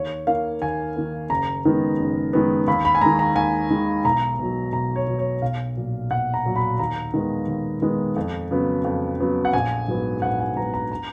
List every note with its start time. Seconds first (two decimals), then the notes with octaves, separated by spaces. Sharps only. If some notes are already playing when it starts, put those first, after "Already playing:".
Already playing: D#2 C#5
0.27 D#3 A#3 F5
0.62 D#2 G#5
0.96 D#3 A#3
1.30 F#1 A#5
1.64 F#2 D#3 G#3 B3
1.99 F#1
2.33 F#2 D#3 G#3 B3
2.67 D#2 B5
2.85 B5
2.95 G#5
3.01 D#3 G#3 A#5
3.19 A#5
3.36 D#2 G#5
3.70 D#3 G#3
4.04 B1 A#5
4.39 B2 F#3
4.73 B1 A#5
4.96 C#5
5.07 B2 F#3
5.18 C#5
5.42 B1 F5
5.77 A#2 F#3
6.11 B1 F#5
6.34 A#5
6.45 A#2 F#3
6.56 B5
6.79 D#2 A#5
7.14 D#3 G#3 B3
7.48 D#2
7.82 D#3 G#3 B3
8.16 F2
8.51 C#3 F#3 B3
8.84 F2
9.20 C#3 F#3 B3
9.45 F#5
9.53 A#1 G#5
9.88 G#2 F#3 B3
10.22 A#1 F#5
10.40 G#5
10.56 G#2 F#3 B3 A#5
10.74 A#5
10.91 A#5